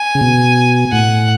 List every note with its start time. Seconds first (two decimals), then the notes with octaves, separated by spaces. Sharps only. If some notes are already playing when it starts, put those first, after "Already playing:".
Already playing: G#5
0.15 C#3
0.21 B2
0.92 A2 F#5